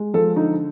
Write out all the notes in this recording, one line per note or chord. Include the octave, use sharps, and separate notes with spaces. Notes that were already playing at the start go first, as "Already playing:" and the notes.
Already playing: G#3
F3 A4
D3 D#4